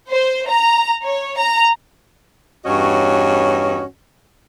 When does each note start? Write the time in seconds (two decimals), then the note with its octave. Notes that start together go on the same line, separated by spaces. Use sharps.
0.10 C5
0.48 A#5
1.05 C#5
1.38 A#5
2.65 E2 G2 C#4 F#4 C#5 D#5